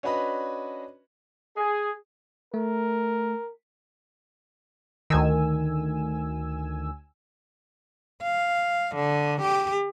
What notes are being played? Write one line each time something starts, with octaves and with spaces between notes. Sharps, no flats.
C#4 D4 F#4 B4 D#5 B5
G#4
A3 A#4
D2 D#3 G#5 E6
F5
D3
G4